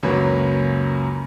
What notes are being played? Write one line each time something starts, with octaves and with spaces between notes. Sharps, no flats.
C#2 F#2 F#3 A#3 B4 C#5